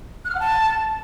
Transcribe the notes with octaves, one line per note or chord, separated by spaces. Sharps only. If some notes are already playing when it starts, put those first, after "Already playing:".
F#6
F6
F#5
A5